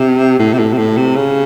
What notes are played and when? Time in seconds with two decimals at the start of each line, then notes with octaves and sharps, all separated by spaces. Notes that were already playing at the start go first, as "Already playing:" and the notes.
Already playing: C3
0.39 A2
0.53 C3
0.59 A2
0.73 C3
0.78 A2
0.97 C3
1.16 C#3